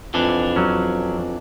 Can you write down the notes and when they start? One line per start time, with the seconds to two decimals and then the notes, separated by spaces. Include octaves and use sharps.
0.14 F2 E3 D4
0.56 F#3 C#4